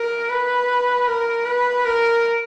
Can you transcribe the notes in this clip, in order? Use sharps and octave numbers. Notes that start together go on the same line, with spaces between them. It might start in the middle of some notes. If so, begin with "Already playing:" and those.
Already playing: A#4
B4
A#4
B4
A#4